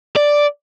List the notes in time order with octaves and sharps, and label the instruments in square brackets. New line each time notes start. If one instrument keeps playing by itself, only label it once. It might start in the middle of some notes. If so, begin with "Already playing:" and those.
[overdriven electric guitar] D5